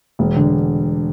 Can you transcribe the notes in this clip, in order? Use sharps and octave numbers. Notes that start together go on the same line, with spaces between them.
E1
D3